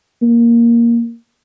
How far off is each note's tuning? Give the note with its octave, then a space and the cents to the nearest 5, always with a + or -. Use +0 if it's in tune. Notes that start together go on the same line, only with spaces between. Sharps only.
A#3 +5